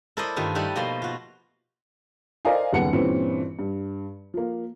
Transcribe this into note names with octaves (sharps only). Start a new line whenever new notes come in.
E4 A4 A#4 C5 D5 D#5
G2 D#3 A3 F4
G3 D#4 E4 A4 F#5
B2 F3 A3 A#3 C6
F4 F#4
A#4 C5 D5 D#5 F5 G#5
F#1 D#2 G3 B3 F#5 C#7
G2 A#2 E3 C4 C#4
G2
F3 A#3